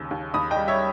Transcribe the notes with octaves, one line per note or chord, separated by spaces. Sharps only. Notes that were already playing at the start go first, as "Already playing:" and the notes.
Already playing: D#2 C#3 E6
D#2
D#2 B5 D#6
D#5 G5
G3
C#5 E5